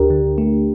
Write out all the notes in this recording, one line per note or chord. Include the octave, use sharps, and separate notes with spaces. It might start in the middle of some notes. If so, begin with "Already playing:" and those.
Already playing: D2 D4 G4 A#4
D3
A3